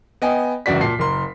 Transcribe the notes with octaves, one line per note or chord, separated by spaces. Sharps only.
B3 D#5 G5 G#5
C#2 F#2 E3 F#4 D5 B6
A#2 A5 C7
F#1 A#4 C6